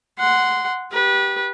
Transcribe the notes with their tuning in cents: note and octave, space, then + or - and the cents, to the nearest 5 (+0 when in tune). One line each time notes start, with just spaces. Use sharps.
F#5 +0 C6 -15
G4 +0 B4 -25